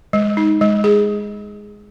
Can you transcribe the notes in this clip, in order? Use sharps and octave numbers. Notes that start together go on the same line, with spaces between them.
G#3
D#4
G#3
G#4